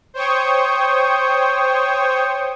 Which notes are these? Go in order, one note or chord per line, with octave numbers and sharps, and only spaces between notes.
C5 C#5 G5 C#6 D#6